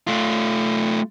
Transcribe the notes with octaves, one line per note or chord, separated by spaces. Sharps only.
A3 F4